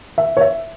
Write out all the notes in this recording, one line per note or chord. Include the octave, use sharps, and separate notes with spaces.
E5
C#5
E5